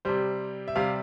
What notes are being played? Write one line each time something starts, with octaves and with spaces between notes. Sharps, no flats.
C3 G3 C5
E5
C3 G3 F5